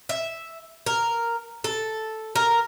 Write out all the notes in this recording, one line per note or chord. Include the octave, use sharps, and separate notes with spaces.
E5
A#4
A4
A#4